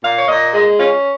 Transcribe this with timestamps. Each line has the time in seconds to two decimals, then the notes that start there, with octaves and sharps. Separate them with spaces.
0.03 A#2 F5
0.17 C#5
0.28 A#2 D#5
0.52 G#3 D#5
0.77 C#4 F4